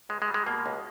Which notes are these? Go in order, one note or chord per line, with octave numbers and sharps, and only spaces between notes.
C#2 G#3
G#3
G3
G#3
B2 A#3
C#2